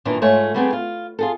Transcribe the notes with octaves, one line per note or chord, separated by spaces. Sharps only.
G2 A#2 D#3 E3 D4
G#2 A3 F4 C#5 G#5
G3 A3 B3 C4 G#4
F4
F4 G#4 A4